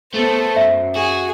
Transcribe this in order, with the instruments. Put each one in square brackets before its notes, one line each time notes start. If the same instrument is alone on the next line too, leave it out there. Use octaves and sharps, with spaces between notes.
[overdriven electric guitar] A3 [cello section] B3 A4 [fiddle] C5
[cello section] F#2 [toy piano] E5
[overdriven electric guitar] F#4 [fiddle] G#4